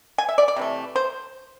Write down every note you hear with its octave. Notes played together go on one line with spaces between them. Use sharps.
G#5
E5
D5
D5
C3 E3 A3
C5